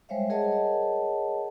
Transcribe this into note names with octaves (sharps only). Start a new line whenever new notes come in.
G3 G#3 C5 C#5 E5 F5
G#4 A#4 C#5 D#5 F#5 A5